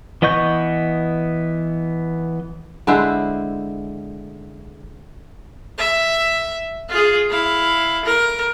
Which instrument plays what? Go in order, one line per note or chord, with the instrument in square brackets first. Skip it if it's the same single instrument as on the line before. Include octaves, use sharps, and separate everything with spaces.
[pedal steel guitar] E3 B3 D#5 C#6 G6
[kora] D3 G#3 E4 C5
[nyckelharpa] E5
F4 G#4
E4 F5
A#4